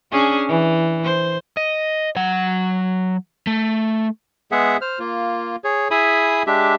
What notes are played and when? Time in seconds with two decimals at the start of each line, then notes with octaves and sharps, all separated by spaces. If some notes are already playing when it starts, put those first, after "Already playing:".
0.12 C#4 D4 G#4
0.48 E3
1.04 C5
1.57 D#5
2.16 F#3 F#5
3.47 A3
4.52 G#3 B3 G#4 E5 F#5
4.81 C5 F6
4.99 A#3 F4
5.64 G#4 C#5
5.91 E4 G#4 E5 G#5 B5 D#6
6.47 G#3 D4 G4 E5